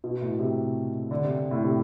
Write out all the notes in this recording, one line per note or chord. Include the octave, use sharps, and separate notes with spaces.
B2
A2
C3
D3
C3
A2
C3